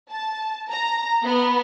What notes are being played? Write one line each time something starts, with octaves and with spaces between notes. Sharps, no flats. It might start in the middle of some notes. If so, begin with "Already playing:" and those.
A5
A#5
B3